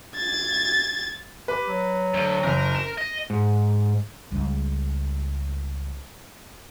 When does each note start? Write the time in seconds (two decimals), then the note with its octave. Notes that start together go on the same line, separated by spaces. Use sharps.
0.16 G#6 A6
1.48 G4 B4
1.68 F#3
2.14 D2
2.43 F#1 A#4 A#5
2.75 E7
2.98 D#5
3.30 G#2
4.31 C#2 G3